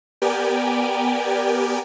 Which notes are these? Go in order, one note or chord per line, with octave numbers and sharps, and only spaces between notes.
B3 G4 A#4 D5 G5 G#5